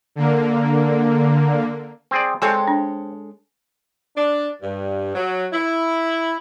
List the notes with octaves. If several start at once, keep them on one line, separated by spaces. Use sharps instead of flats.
D3 A#3
C4 G#4 D5
G#3 C4 A4 C#5 G#5
D4
D4
G2
F#3
E4